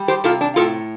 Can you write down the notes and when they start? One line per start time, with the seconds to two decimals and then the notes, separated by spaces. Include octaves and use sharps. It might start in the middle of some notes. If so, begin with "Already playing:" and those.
Already playing: G3
0.08 G4 C5
0.24 C3 F4 A4
0.41 D4
0.56 A2 F4 A4